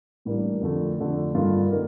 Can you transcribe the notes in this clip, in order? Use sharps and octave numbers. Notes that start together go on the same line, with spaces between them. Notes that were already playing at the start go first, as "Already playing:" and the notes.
A1 A2 G3 A#3 D4
F2 D3 A3
F2 D3 A3
G2 D#3 A#3 F4 A4
D#3 A#3